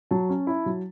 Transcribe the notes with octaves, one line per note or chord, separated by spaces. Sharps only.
F#3 A5
C#4
E4
F#3